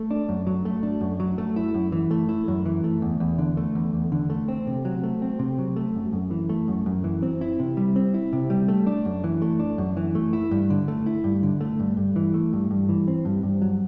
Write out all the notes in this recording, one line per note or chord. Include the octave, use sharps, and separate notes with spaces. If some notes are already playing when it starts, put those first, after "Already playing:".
Already playing: A3
D4
F#2
F#3
A3
D4
F#2
F#3
A3
E4
F#2
E3
A3
E4
F#2
E3
A3
E2
E2
D3
A3
E2
E2
D3
A3
C4
C3
F#3
A3
C4
C3
F#3
A3
F#2
F#2
E3
A3
F#2
F#2
E3
C4
E4
C3
G3
C4
E4
C3
G3
A3
D4
F#2
E3
A3
D4
F#2
E3
A3
E4
G2
D3
A3
E4
G2
D3
A3
G2
G2
E3
A3
G2
G2
E3
C4
G2
G2
F#3